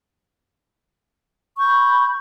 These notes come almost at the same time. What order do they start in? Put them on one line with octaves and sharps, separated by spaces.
C#6 G6 B5